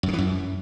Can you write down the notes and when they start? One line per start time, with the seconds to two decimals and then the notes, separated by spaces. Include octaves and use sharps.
0.03 F#2
0.08 C#3
0.13 E3
0.18 F#2